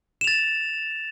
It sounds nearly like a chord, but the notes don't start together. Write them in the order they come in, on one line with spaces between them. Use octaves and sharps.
E7 F7 A6